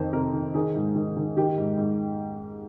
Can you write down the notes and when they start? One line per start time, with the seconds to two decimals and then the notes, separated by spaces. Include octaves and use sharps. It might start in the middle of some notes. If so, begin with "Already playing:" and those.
Already playing: F2 D#3 C5
0.13 C3 A#4
0.33 D#3
0.54 D#3 G#4
0.75 G#2
0.95 D#3
1.16 D#3
1.36 D#3 G4
1.58 G#2
1.78 G#2